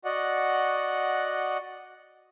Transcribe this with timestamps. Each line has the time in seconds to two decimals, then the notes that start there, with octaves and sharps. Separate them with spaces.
0.05 F#4 D5 D#5 F#5